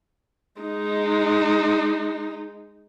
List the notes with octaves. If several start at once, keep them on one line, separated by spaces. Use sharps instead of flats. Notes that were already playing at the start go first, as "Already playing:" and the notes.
G#3 D#4